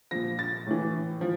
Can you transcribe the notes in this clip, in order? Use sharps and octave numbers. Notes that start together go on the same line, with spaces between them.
A#2 F3 A#6
A6
A2 E3
F3